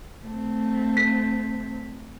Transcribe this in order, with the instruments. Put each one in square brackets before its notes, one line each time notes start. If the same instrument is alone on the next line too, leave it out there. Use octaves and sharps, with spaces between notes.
[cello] A3 C4
[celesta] B6